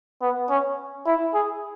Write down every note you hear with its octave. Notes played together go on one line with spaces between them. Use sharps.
B3
C#4
E4
G#4